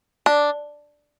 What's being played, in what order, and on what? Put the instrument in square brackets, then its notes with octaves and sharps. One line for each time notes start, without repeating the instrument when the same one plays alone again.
[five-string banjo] D4